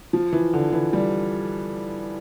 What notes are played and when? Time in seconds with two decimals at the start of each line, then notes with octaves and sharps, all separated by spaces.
0.13 F3
0.33 E3
0.53 D3
0.73 E3
0.93 G3